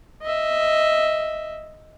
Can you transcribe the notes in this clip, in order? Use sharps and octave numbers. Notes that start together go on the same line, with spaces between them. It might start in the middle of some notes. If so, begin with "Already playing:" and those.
D#5 E5